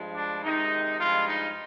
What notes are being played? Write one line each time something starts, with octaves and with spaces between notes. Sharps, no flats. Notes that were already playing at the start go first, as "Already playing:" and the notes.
Already playing: G2 F3 G#3
D4
C3 D#3 G#3 D#4
G2 F3 G#3 F4
D#4